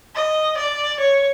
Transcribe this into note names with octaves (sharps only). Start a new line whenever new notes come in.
D#5
D5
C#5